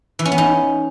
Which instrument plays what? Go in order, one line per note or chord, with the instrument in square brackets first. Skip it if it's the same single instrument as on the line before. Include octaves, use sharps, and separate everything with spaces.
[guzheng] E3
C#4
B3
D#4